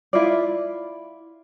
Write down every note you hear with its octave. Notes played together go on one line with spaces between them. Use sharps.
E4 F4 D5